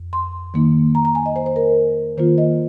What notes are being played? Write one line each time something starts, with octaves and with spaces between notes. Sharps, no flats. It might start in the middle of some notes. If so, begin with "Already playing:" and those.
Already playing: F2
C6
D#3 A#3 D#4
A#5
A#5
G#5
D#5
C5
C5
A#4
D#3 A#3 F4 C5
D#5